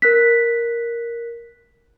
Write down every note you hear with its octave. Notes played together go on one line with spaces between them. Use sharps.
A#4 F#6 B6